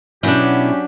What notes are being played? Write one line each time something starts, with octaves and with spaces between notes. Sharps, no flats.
B2 F#3 B3 C#4 D4 E4 G4